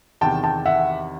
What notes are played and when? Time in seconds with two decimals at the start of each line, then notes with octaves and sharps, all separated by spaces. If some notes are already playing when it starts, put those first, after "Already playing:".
0.21 E2 C3 D#3 G5 A5
0.44 G5 A5
0.66 E5 F#5